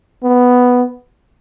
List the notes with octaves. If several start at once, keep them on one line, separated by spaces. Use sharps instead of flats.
B3